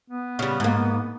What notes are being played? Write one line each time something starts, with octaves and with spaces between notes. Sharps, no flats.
B3
C#3 G3
G#2 A#3